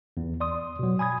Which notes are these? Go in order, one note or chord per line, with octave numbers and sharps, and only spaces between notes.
E2
D5 C6 D#6
B2 F#3
G#5 B5 D#6 G#6